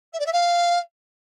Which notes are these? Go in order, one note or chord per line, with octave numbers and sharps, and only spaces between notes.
E5
D5
E5
F5